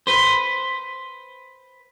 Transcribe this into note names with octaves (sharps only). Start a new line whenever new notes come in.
B4 C5